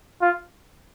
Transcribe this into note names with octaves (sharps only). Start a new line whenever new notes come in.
F4